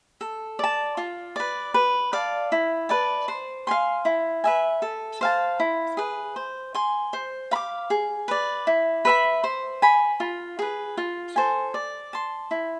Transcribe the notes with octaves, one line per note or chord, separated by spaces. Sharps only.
A4
D5 A5
F4
B4 D5
B4
D5 F5 A5
E4
B4 D5 A5
C5
F5 G#5 C6
E4
B4 E5 G#5
A4
C5 F5 A5
E4
G#4 B4
C5
G#5 C6
C5
F5 B5 D6
G#4
B4 D5
E4
B4 E5 B5
C5
G#5 B5
F4
G#4 B4
F4
A4 C5 G#5
D5
A5 C6
E4